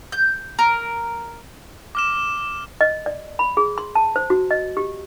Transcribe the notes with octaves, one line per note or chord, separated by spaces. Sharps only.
G6
A#4
D6 F6 E7
D#5
D5
B5
G#4
C6
A5
C5
F#4
D#5
G4